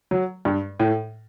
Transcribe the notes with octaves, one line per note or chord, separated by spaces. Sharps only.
F#3
G2
A2